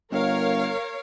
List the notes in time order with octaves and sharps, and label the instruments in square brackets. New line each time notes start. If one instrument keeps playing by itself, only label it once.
[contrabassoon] G1 [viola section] A#4 C#5 F5